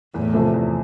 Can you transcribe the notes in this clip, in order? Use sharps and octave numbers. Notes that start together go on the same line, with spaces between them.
E2 A2
C3 F3 A3
E2